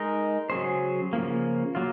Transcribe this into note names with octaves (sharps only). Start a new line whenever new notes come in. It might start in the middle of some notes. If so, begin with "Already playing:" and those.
Already playing: G#3 D#4 A#4 D#5
C#3 F#3 C#4 G#4 C5
C#3 F3 A#3
F#3 A#3 F4